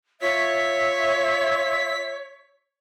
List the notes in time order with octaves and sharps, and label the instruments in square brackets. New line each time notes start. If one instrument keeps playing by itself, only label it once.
[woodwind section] F4 E5 [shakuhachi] C#5 [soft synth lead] B6